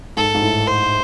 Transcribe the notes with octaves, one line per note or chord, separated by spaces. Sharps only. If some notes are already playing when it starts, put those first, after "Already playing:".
G#2 A4
G#2
A2
C5